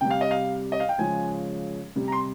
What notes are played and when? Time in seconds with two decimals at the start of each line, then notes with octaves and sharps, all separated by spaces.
0.01 C3 G3 G5
0.10 F5
0.21 D#5
0.31 F5
0.72 D#5
0.80 F5
0.89 G5
0.98 C#3 F3 G#3 G#5
1.96 C3 G3
2.08 A#5
2.12 C6